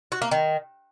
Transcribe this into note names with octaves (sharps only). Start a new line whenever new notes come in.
F#4
A#3
D#3